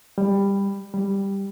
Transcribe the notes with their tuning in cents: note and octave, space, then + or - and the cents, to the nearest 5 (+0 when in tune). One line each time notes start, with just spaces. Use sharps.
G3 +15
G3 +5